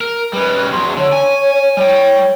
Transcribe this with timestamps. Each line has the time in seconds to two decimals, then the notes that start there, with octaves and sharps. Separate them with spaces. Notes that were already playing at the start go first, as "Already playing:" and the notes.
0.01 A#4
0.33 G3 C#4 B4
0.71 E2 F#3 C6
0.97 D3 C#5
1.12 G#5
1.77 G3 C#5 G5